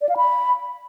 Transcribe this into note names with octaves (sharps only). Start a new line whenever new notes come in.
D5
F5
B5